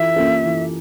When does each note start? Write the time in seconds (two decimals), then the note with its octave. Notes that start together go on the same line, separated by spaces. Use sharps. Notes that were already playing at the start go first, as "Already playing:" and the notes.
Already playing: E3 F4 A4 E5
0.16 A#3 C#4 F4 A4
0.45 E3